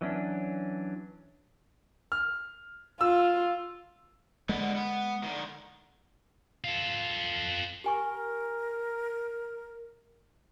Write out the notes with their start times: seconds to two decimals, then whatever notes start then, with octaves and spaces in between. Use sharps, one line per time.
0.01 E3 F#3 C#4 D4
2.12 F6
3.01 F4 E6
4.49 D3 G#3 B3
4.76 B3
5.23 D3 D#3
6.64 F4 A4
7.84 G4 A#4 G#5 C#6